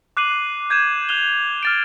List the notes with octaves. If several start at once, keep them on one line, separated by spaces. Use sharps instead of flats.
D6 F#6 C7 D#7 F#7
G6 G#6 D#7 E7
F#6 F7 G7
F6 A6 D7